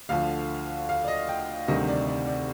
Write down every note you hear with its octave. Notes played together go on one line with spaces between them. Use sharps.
D2 D3 F3 F5
F5
D5
D#5
G5
D2 C3 D#3 G3 D#5
D5
D5
D5